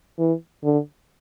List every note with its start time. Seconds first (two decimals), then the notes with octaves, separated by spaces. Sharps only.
0.19 E3
0.64 D3